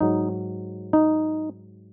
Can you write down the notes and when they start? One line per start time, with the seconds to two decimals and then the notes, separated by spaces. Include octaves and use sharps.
0.01 G#2 F#3 D#4
0.93 D#4